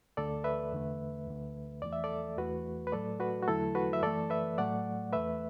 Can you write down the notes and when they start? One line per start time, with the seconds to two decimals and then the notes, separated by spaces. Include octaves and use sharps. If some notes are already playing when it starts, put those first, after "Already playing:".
0.17 D2 D3 A3 A4 D5
0.44 B4 E5
0.72 E2 D3 A3
1.27 D2 D3 A3
1.82 E2 E3 A3 D5
1.92 E5
2.04 A4 D5
2.37 E2 E3 A3 F#4 B4
2.87 B4
2.92 A2 F#3 A3 A4 D5
3.20 F#4 B4
3.43 F#4
3.47 E2 D3 F#3 A3 E4 A4
3.75 F#4 B4
3.93 E5
4.02 F#2 E3 A3 A4 D5
4.30 B4 E5
4.58 A2 F#3 A3 D5 F#5
5.12 E2 E3 A3 B4 E5